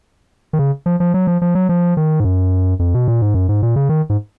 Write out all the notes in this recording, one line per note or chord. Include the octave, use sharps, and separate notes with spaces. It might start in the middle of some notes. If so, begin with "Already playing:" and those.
D#3
C#3
F3
F3
F#3
F3
F3
F#3
F3
D#3
G#2
F#2
F2
B2
A#2
G#2
F#2
G#2
A#2
C#3
D#3
G#2